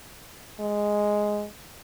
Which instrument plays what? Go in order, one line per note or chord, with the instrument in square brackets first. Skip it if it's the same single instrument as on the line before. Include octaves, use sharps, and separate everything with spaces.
[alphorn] G#3